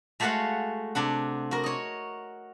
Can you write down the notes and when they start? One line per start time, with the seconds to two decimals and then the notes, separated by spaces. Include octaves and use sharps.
0.20 G#3 A3 F#4 C#5 F5 F#5
0.95 C3 D4 F#5
1.51 F#4 A#4
1.64 C#5 D#5